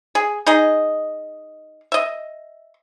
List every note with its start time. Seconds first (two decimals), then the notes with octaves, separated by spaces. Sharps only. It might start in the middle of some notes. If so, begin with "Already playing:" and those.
0.15 G#4
0.46 D#4 G#4 D#5
1.92 D#5 E5